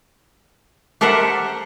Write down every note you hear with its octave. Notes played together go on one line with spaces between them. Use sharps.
G4 A4 A#4 C5 E5 F#5